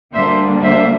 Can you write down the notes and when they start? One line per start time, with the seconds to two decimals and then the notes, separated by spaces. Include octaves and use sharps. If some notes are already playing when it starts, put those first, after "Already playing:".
0.14 D2 D3 G3 A#3 D4 C5 E5
0.63 C5 E5